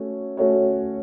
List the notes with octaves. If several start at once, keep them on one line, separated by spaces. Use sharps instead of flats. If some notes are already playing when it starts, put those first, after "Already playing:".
Already playing: A3 C#4 F#4 C#5
A3 C#4 F#4 C#5